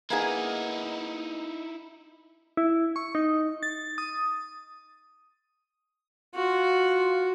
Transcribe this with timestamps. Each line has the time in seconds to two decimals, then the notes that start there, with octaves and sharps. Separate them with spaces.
0.10 A#3 B3 D#4 E4 G#4
2.57 E4
2.96 C#6
3.15 D#4
3.63 A6
3.98 D#6
6.35 F4 F#4